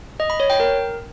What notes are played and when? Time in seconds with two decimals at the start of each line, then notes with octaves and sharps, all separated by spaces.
0.20 D#5
0.30 B5
0.40 C#5
0.50 G5
0.60 A#4